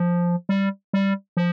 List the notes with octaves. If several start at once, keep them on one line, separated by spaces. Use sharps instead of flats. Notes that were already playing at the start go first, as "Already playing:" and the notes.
Already playing: F3
G3
G3
F3